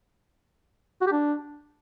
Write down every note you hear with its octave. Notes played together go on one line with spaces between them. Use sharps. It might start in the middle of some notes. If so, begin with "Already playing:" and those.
F#4
G4
D4